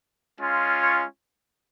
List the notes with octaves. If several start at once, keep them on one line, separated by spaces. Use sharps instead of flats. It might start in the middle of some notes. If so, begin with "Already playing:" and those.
G#3 C#4 F4
C#5